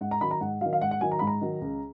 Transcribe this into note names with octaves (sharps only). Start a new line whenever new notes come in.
G#2 F#5
A#5
D#3 F#3 B5
A#5
G#2 F#5
D#3 F#3 F5
F5
G#2 F#5
F#5
D#3 F#3 G#5
A#5
G#2 B5
A#5
D#3 F#3
C#2